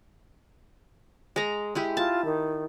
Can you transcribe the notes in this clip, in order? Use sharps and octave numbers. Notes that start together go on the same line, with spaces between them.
G#3 A#5
G#3 E4 G4
F4 A5
D#3